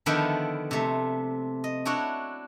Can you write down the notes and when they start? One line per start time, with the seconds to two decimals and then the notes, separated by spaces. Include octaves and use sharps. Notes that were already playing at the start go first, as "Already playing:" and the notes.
0.06 D3 D#3 F3 B3 D4 E4
0.71 C3 A3
1.64 D#5
1.85 D4 E4 F#4 C#5